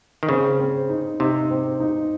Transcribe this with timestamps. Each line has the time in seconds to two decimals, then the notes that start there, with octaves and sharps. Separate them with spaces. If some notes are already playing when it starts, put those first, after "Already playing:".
0.23 D#3
0.29 C#3 C4
0.60 C4
0.89 D#4
1.20 C3 D#4
1.50 C4
1.80 D#4